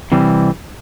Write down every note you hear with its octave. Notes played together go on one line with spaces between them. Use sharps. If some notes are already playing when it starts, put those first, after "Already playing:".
C3 E3 G3 C4